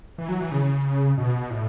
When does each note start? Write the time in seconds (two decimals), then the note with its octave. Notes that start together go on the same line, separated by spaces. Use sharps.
0.18 E3
0.29 F#3
0.41 E3
0.52 C#3
1.18 B2
1.50 A2